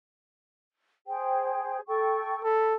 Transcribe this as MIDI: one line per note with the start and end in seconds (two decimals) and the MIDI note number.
1.07 1.78 68
1.07 1.78 72
1.07 1.78 79
1.87 2.42 69
1.87 2.42 79
1.87 2.42 85
2.44 2.75 69
2.44 2.66 83